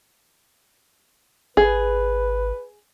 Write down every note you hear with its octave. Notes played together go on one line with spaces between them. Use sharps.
G#1 G#4 B4